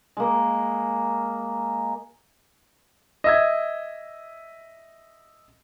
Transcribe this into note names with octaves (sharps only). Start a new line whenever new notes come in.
G#3 A#3
D#5 E5 G#6